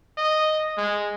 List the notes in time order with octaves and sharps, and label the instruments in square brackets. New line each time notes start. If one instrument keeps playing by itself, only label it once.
[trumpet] D#5
G#3